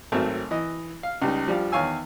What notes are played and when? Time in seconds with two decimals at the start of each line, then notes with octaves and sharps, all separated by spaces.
0.12 G#1 F#3 A3 C4 A#4 A5
0.51 E3 D#5
1.03 F5
1.22 C#2 G3 D#4
1.47 F3 G3 D4 F4
1.72 E2 D#3 C#5 F5 G#5 E6